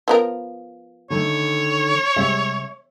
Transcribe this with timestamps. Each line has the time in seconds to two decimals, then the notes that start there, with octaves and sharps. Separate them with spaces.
0.08 F3 B3 A#4
1.10 D3 D#3 A3 C#5
2.16 C3 G3 G#3 E5